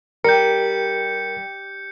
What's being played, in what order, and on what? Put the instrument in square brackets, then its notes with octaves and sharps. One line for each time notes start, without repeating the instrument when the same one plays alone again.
[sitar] G3 [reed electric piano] A#4 [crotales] G6 C#7